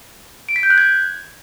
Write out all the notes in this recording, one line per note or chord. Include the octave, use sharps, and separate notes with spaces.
D7
B6
G6
F#6
G#6